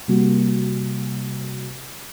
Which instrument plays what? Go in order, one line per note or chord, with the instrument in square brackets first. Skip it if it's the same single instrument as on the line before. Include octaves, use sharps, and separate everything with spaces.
[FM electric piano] C3 G3 A#3 F#4